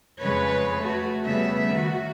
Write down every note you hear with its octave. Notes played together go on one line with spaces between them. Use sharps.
F2 C#3 G#3 B4 C#5
A3 F#4
C#3 G3 A3 B3 E5
D#3 F#4